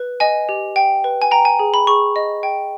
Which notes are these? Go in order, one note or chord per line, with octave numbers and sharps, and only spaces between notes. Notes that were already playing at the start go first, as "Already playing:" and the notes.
Already playing: B4
D#5 G#5
G4
G5
B4
G#5
G5 A#5
G#5
G#4
B5
G#4 C#6
D#5
G5